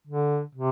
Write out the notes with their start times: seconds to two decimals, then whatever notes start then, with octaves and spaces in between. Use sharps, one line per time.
0.07 D3
0.55 C3